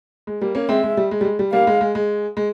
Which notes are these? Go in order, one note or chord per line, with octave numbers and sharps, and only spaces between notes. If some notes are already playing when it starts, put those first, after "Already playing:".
G#3
G3 A#3
A#3 C#4
G#3 C4 E5
G#3
G3
G#3
G3
G#3
G3
G3 A#3 F5
G#3
G#3
G#3
G#3